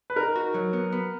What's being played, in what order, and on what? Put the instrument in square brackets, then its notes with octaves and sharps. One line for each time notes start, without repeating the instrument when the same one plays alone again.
[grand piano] B4
[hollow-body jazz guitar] D#4 [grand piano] A#4
[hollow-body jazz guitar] F#4
F#3
B3
B3